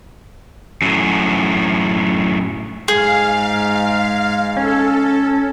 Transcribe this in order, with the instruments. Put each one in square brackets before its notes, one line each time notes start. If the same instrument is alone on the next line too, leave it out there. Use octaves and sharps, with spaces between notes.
[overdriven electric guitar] F#2 A2
[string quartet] G#2 [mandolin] G#4 [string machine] F5
[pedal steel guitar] C#4 [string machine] A4